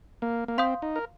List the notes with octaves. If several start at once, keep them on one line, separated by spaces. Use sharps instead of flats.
A#3
A#3
C4 F5 C6 D#6 G6
D#4
A#4